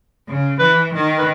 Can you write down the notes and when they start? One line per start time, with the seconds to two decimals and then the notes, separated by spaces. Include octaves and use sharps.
0.27 C#3
0.59 E3 B4
0.92 D#3
1.18 B4